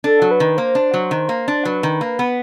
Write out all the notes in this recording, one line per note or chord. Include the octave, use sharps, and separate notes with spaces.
D4 A4
F#3
B4
D#3
A#3 C5
D4
F#3
D#3
A#3
D4
F#3 B4
D#3
A#3
B3